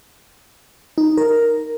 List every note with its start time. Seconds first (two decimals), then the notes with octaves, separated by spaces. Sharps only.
0.98 D#4
1.17 A#4